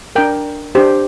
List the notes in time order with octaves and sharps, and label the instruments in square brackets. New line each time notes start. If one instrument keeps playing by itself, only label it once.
[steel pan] D4 A#4 G5
D4 G4 C5